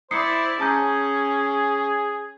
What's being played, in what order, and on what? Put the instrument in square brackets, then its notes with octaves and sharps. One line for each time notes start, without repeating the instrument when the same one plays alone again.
[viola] E4 D5 [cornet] C5 [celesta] D#6 C7 C#7
[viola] C#4 [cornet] G#4 [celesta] A5 A#5 G6